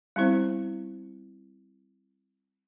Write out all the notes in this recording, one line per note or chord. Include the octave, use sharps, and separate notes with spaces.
G3 B3 C4 E4 C5